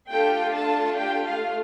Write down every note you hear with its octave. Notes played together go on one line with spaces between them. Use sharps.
A3 D4 F4 G4 A4 G5
A4 A5
G4 G5
F4 F5